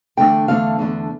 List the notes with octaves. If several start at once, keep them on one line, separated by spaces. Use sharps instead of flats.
E2 D3 A3 D4 G5
E2 D3 A3 D4 F5
E2 D3 A3 D4